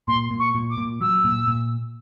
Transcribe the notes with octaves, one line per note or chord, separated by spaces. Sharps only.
A#2 C6
A#2
C#6
A#2
D6
A#2
F#3 E6
A#2
A#2